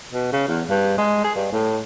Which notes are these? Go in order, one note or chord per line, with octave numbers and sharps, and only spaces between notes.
B2
C#3
E2
G2
G#3
G#4
G2
A2